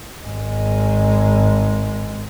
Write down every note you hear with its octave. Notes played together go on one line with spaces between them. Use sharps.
G#1 G#3